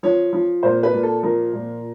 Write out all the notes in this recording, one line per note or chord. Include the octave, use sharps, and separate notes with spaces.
F3 C#5
F3
A#2 C5
B4
A#2
A4
F3 A#4
A#2